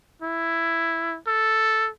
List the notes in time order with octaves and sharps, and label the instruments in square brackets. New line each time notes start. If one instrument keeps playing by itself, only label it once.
[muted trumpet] E4
A4